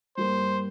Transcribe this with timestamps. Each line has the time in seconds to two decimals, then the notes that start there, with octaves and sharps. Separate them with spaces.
0.17 G2 G3 A#3 C5